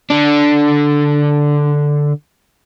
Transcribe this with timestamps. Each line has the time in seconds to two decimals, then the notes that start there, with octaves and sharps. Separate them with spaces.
0.10 D3 D4